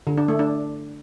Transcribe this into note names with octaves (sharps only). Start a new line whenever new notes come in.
D3
D4
A3
D4